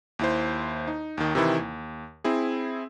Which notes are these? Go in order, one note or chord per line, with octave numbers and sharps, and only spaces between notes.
D#2 E4 C5
D#4
D#2 D#3
C3 D#3 E3 E4
D#2
C4 E4 G#4